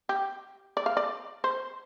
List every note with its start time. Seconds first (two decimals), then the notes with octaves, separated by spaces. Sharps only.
0.09 G4
0.77 D5
0.86 F5
0.97 D5
1.44 C5